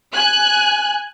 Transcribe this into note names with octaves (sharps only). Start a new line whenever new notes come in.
G#5 F#6